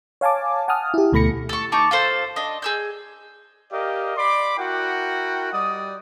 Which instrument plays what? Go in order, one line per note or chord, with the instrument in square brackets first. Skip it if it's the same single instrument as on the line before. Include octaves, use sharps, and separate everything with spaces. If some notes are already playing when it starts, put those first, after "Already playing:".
[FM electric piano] C#5 F5 G#5 A5 D6
F#5 G#5 A5 D#6 F6
E4 G4
D2 B2 A3 B5 A#6 C#7
[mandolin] A4 C#6
D#4 A5 C#6 D6
F4 A4 C5
D4 D#5
G#4 E6 G6
[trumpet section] G4 A#4 D5 D#5 F5
D5 B5 C6 D6
E4 F#4 A#4 F#5 G5
G3 D5 D#5 D#6